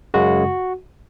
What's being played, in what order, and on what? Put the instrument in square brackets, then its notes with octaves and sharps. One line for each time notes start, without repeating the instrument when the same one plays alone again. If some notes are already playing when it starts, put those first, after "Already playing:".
[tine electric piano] F#2 C#3 G#3 F#4